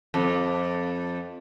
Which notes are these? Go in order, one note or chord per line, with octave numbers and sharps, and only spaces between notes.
F2